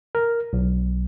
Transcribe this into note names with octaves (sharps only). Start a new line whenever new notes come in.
A#4
B1